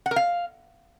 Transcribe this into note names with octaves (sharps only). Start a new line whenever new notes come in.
F#5
A#4
F5